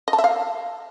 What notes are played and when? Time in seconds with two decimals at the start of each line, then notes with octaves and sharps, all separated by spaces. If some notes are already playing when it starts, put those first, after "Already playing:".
0.08 D#5
0.13 A5
0.18 E5
0.24 F5